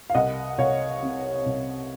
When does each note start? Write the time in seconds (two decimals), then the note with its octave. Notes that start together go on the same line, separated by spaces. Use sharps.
0.10 F5
0.14 C2 D#5 F#5
0.58 C2 C#5 F5
1.03 C3
1.46 C2